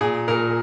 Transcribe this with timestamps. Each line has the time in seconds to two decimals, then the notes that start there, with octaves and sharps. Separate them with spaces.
0.01 A#2 G#4
0.28 A#2 A#4